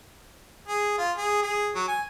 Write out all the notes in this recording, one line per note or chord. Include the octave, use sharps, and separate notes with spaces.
G#4
F4
G#4
G#4
F#3
G#5